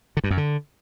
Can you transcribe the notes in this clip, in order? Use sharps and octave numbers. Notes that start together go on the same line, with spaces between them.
D3
G2
F#2
D3